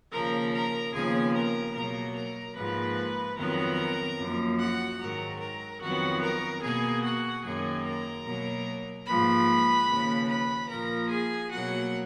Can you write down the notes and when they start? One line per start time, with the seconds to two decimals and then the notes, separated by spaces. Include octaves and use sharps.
0.12 D#2 C#3 F3 A#4 A#5
0.53 A#4 A#5
0.94 D#2 C#3 F3 B3 G#4 G#5
1.34 A#4 A#5
1.75 B2 F#3 A#3 A#4 A#5
2.16 A#4 A#5
2.57 G#2 F3 A#3 B4 B5
3.38 F2 D#3 F#3 B3 A#4 A#5
4.19 F#2 F3 A#3
4.60 F#4 F#5
5.00 G#2 D#3 F#3 A#4 A#5
5.41 A#4 A#5
5.82 F2 D#3 F#3 B3 F#4 F#5
6.23 A#4 A#5
6.64 B2 A#3 G#4 G#5
7.04 F#4 F#5
7.45 F#2 D#3 A#3 G#4 G#5
7.86 A#4 A#5
8.26 B2 F#3 A#3
9.08 G#2 F3 A#3 B4 B5
9.89 D#2 C#3 F3
10.29 B4 B5
10.70 A#2 F3 A#3 A#4 A#5
11.11 G#4 G#5
11.52 B2 F#3 A#3 F#4 F#5